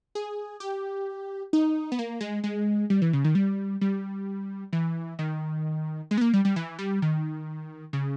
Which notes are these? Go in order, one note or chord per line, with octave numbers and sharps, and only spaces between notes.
G#4
G4
D#4
B3
A#3
G#3
G#3
G3
E3
C#3
D#3
G3
G3
E3
D#3
G#3
B3
A#3
G3
G3
E3
G3
D#3
C#3